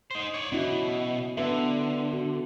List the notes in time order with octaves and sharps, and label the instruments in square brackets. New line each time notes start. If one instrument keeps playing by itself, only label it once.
[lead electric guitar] D#4 C5
C#5 D5
[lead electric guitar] B2 [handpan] C#4 E4 F#4
[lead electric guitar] D3 [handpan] B3 B4 E5
[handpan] F#4